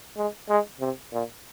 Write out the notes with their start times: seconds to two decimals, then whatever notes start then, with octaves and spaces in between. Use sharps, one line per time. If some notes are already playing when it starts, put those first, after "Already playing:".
0.17 G#3
0.49 G#3
0.80 C3
1.12 A#2